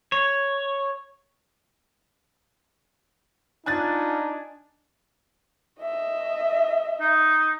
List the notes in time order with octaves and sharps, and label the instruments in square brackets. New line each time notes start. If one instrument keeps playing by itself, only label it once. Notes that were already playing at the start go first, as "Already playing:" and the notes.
[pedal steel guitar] C#5
[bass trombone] D4 [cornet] D#4 [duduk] F4 [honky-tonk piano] G#5 F#6 A6
[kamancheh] D#5 E5
[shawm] D#4